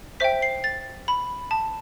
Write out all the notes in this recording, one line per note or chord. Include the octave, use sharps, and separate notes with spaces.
C5 E5 G5 B6
C7
A6
B5
A5